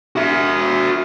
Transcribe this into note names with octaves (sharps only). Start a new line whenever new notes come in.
F#4 E5